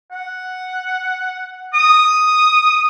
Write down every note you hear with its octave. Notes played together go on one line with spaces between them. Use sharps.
F#5
D#6